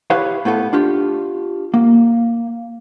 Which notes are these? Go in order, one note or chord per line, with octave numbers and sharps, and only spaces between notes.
E4 G4 B4 C#5 F5
A2 B3 E4 A4
D4 F4 G4
A#3